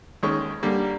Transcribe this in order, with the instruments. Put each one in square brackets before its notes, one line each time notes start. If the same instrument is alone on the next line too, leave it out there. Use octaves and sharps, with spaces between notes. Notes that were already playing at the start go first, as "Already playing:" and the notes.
[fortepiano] D#2 D#3 G#3 C#4 C#6
D3 G3 A#3